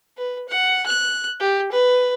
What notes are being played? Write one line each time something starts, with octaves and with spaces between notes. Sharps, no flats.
B4
F#5
F#6
G4
B4